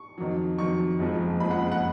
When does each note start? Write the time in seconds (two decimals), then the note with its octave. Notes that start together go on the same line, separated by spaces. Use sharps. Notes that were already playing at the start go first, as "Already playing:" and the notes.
Already playing: C#6
0.18 F2 D#3 F#3
0.58 F2 D#3 F#3 C#6
0.99 F#1 F2 F3 G#3
1.40 F#1 F2 F3 G#3 B5
1.51 F#5
1.72 F#5